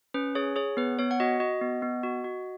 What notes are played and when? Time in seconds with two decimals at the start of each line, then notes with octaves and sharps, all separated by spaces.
0.14 C#4 B4
0.35 G#4 C#5
0.56 G#4 C#5
0.77 B3 B4
0.99 B3 C#5
1.11 F#5
1.20 F#4 D#5
1.40 F#4 D#5
1.61 B3
1.82 B3
2.03 F#4
2.24 F#4